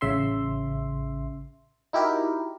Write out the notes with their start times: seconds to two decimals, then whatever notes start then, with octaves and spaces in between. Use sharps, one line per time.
0.01 A1 C#3 E5 C6
1.93 D#4 E4 F#4 G4 A#4